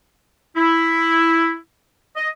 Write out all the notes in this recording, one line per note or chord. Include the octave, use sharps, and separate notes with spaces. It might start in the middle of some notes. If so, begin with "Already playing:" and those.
E4
D#5